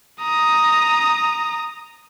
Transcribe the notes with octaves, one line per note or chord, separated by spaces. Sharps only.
A#5 D#6